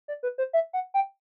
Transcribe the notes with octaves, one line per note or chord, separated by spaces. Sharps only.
D5
B4
C5
E5
F#5
G5